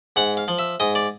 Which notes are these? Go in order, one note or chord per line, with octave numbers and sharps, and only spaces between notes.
G#2 F#5
F5
F3
E5
G#2 D#5
D5